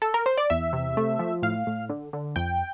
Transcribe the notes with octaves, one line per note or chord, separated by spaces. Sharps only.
A4
A#4
C5
D5
E2 E5
C3
A3
F3
A2 F5
A2
D3
D3
F2 G5